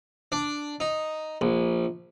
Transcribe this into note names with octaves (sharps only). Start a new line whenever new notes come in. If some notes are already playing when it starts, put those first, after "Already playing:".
D4
D#4
A#1